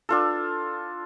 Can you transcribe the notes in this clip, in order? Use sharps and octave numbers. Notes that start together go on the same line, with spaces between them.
D4 F4 A4